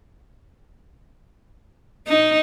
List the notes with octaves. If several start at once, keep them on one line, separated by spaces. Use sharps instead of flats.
D#4